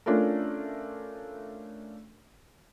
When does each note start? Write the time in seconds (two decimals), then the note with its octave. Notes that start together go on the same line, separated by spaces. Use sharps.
0.06 A3 C#4 D4 F4 A4 A#4